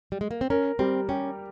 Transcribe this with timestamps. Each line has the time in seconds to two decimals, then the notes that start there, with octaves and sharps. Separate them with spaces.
0.12 G3
0.21 G#3
0.31 A#3
0.41 C4
0.50 C#4 A#4
0.79 G3 C4
1.09 C#4 G4